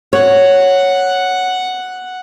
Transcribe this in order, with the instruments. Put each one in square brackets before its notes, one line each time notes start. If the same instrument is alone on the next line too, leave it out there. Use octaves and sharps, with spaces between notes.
[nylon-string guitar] C#5 [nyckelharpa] F#5